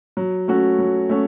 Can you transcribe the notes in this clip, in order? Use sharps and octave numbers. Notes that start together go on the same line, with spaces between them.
F#3
A3 C#4 F#4
F#3
A3 C#4 F#4